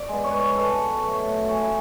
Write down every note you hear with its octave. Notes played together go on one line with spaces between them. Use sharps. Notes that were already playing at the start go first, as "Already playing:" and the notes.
Already playing: D5
G#3 B3
C#5
B4
C#5
B2 A4
F#3 A3
F#4
A2 G#4
E4